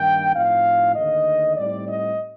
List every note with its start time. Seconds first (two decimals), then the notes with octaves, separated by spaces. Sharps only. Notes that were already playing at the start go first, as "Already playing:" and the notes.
Already playing: G2 D#3 A#3 D#4 G5
0.34 A2 F3 C4 D#4 F5
0.96 D#2 D3 A3 D#5
1.56 A2 G3 C4 D#4 D5
1.88 D#5